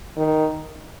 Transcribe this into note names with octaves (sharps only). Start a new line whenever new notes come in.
D#3